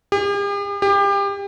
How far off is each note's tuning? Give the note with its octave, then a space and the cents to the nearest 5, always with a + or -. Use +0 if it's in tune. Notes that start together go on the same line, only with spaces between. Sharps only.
G4 +45
G4 +30